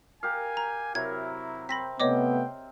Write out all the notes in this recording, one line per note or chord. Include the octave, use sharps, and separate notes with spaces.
G4 A#4 F5 G#5
A#5
C3 F#3 E4 A#4 G#6
C4 B5 A#6 B6
C3 A3 B3 C#5 D#5 G5 D6